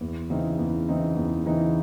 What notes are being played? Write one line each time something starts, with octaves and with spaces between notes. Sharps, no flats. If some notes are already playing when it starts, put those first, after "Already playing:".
E2
C#3 E3 C4 D#4
E2
C#3 E3 C4 D#4
E2
C#3 E3 C4 D#4